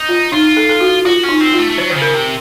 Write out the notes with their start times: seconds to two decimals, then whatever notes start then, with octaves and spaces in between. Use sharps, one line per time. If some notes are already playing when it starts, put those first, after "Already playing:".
Already playing: D#4
0.09 F4
0.32 D#4 F4
0.57 A4
0.69 A4
0.80 F#4
1.05 F4 F#4
1.24 C#4
1.29 D#4
1.41 C4
1.53 F4
1.59 A3
1.70 A3
1.77 F#3 C5
1.90 D#3 C5
1.96 C#3
2.02 A#4
2.14 C3